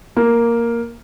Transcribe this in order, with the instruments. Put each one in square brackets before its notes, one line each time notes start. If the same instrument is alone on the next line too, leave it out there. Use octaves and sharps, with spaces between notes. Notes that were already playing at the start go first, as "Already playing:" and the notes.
[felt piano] A#3